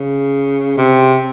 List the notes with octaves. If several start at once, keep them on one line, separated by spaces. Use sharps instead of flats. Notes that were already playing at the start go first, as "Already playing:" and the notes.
Already playing: C#3
C3